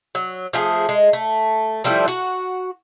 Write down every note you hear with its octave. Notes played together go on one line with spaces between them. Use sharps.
F#3
F3 A3 G#4
G#3
A3
F3 G3 A3 E4
F#4 F#5